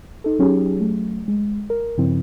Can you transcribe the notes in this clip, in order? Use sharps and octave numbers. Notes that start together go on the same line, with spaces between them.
D#4 A4
F#3 C#4 D#4 G4 G#4
F#3 A3
G#3
A#4
G2 C#3 F3 C4 E4